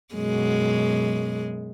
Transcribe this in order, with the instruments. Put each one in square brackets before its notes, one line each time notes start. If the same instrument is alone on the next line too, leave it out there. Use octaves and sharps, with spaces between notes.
[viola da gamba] F#2 B2 G#3